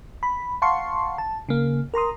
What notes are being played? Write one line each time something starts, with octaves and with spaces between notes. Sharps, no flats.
B5
F5 F#5 A5 C6 C#6
A5
C#3 A#3
A#4 A#5 C6 D#6